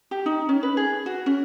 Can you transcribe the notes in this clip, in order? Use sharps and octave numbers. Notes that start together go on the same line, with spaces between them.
G4
D#4
C#4
B4
G#4
F#4
C#4